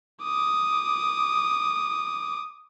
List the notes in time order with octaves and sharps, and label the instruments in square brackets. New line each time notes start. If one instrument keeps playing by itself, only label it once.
[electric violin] D6 D#6